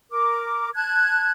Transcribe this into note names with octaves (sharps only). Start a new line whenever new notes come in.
A#4 D6
A5 F#6 G#6